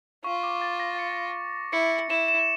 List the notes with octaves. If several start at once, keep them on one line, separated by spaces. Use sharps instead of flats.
F4 C#6
D6
A6
A#6
C#7
E4 C#7
E4 E7
E7